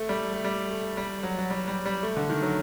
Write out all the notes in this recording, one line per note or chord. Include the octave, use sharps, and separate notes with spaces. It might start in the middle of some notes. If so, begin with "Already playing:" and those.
Already playing: A3
G3
A3
G3
A3
G3
F#3
F#3
G3
G3
G3
A3
D3
D#3
F#3